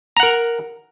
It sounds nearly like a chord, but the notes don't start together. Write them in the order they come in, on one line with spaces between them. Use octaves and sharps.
A#5 F#5 A#4